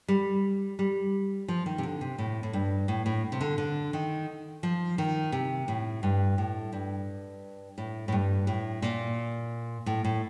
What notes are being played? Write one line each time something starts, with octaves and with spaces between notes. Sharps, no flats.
G3
G3
F3
D#3
C3
D3
C3
A2
A2
G2
A2
A2
C3
D3
D3
D#3
F3
D#3
C3
A2
G2
A2
G2
A2
A2
G2
A2
A#2
A2
A2